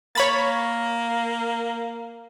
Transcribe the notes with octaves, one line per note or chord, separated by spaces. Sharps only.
A#3 C#5 B5 A6